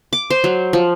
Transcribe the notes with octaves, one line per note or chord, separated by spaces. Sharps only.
D6
C5
F#3
F3